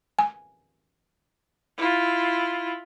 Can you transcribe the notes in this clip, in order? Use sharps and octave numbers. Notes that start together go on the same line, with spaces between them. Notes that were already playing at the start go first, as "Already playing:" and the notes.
G#5
E4 F4